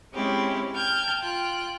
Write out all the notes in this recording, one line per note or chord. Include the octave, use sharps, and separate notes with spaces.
G#3 C4 C#4 E4 G4
G5 A5 F6 G6 G#6
F4 G5 F#6